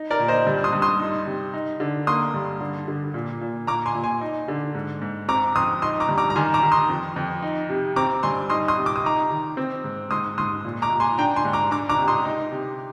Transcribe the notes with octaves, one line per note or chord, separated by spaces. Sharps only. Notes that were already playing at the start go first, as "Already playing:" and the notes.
Already playing: D#4
A#4 D5
A#2
C5 D#5
G2
C6 D#6
G2
C6 D#6
D#4
C3
D#4
D3
A#3 C6 D#6
G2
D3
D3
A#2
A#2
A#2 A#5 D6
G#5 C6
A#2
G#5 C6
D#4
D3
G#2
G#2
C4 A#5 D6
F2 C6 D#6
D#4 C6 D#6
A#5 D6
G2
A#5 D6
A#5
D#3 G#5 C6
A#5 D6
D#3
C6 D#6
F2
F2
D#4
C3
C4 A#5 D6
G2 G#5 C6
D#4 C6 D#6
C6 D#6
C3
D6
D#6
D#4 A#5 D6
D#3
C4
G#2
G#2 C6 D#6
G#2 C6 D#6
A#2
A#5 D6
A#2
G#5 C6
D4 G5 A#5
G#5 C6
G#2
A#5 D6
D4 A#5 D6
A#5 D6
C3
C6 D#6
D#4
C3